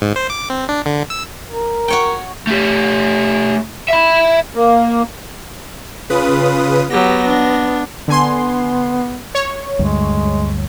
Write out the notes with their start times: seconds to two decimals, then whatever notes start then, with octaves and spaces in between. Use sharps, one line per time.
0.02 G#2
0.16 C5
0.30 D6
0.50 C4
0.69 D4
0.86 D3
1.10 E6
1.51 A#4
1.88 F#4 C#5 G5
2.47 A3 G4
3.88 E5 B5
4.55 A#3
6.10 C#3 F4 B4 D#6
6.90 F#3 B3 G4 A#6
7.27 D4
8.08 D3 B3 G#5 C6
9.35 C#5
9.79 D2 G2 G#3